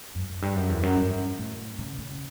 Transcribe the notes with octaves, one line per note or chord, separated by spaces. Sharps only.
F#2
F#2
G2
F#2
E2
F#2
G2
A2
C#3
C#3